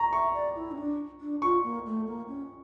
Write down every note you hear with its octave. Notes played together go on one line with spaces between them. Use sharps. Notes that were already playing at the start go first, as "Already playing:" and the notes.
Already playing: A#5 C#6
E5 C#6
D5
E4
C#4
D4
D4
F4 C#6
A#3
A3
A#3
C#4